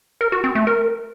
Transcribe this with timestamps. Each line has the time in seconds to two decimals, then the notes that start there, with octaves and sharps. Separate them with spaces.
0.21 A#4
0.32 F#4
0.44 C4
0.55 A3
0.67 A#4